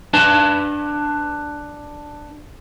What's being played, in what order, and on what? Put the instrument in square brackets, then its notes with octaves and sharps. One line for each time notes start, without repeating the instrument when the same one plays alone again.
[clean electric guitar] D4 B4 A5